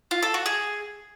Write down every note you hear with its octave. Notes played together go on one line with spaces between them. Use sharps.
F4
A4
F#4
G#4